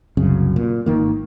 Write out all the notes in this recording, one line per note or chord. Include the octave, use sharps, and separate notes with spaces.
F#1 C2 F#2 C#3
A#2
G#1 D#3 A#3